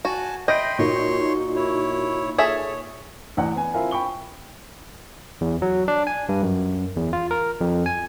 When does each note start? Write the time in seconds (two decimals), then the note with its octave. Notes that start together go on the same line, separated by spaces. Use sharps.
0.05 F#4 G#5 A5
0.48 D#5 E5 G5 B5 C6 G6 A#6 D7
0.79 A#2 A#3 D#4 F#4 C#5 C6 C#6
1.56 E4 C#5
2.38 G#4 A4 C#5 E5
3.37 A1 E2 D5 F#5
3.56 B3 G#5
3.73 C4 E4 F4 A#4 G#5
3.91 G5 B5 C#6 G7
5.41 E2
5.62 F#3
5.88 D4
6.07 G#5
6.29 G2
6.43 F#2
6.96 E2
7.13 F4
7.31 A#4
7.61 F2
7.86 G#5